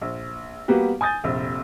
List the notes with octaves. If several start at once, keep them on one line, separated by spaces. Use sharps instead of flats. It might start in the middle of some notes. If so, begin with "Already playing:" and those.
A#1
G3 A#3 B3 F#4 G4
G#5 D#6 G6 A6
F1 A#1